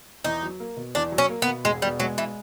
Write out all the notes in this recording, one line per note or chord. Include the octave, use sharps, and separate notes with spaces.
E2 D#4
F#3
A#3
B2
E2 D4
F#3
C#4
A#3
B3
B2
E1 G#3
B2 G3
F#3 G#3
E3